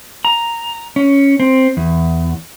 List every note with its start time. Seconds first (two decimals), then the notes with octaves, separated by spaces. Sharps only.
0.25 A#5
0.96 C#4
1.40 C4
1.77 E2